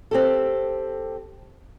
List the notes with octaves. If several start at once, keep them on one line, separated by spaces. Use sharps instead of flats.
C4 G4 A4